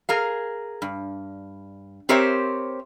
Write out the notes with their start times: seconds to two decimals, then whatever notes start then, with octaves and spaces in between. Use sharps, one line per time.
0.09 G#4 A#4 F5
0.82 G2
2.09 C4 G4 A#4 C5 C#5 E5